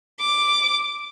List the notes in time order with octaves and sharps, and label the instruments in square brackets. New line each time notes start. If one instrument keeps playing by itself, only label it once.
[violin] D6